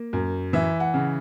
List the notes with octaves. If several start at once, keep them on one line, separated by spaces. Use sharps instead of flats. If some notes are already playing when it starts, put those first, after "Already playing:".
Already playing: A#3
F#2
E3 E5
F#5
C#3